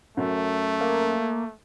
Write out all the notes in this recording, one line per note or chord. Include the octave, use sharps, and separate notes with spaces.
F#2 A3
A#3